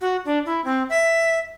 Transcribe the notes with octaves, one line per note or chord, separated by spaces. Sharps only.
F#4
D4
E4
C4
E5